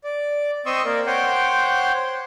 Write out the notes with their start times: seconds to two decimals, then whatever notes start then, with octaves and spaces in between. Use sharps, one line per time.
0.04 D5
0.66 C4 D#5 C6 C#6 D#6 E6
0.85 A#3 A#4 D5
1.07 C5 C#5 F#5 G5 C6 D6